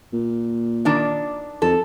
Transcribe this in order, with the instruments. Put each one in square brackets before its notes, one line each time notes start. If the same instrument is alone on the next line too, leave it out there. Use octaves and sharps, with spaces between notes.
[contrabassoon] A#2
[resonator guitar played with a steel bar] D#3 D4 D5
[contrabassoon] F2 [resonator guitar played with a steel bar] A4